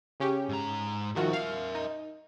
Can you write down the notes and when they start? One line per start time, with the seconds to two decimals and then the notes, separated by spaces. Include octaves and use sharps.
0.20 C#3 C#4 G4
0.49 G#2 A#5
1.16 D#3 F3 F#4 A#4 E5
1.33 F5
1.75 D#4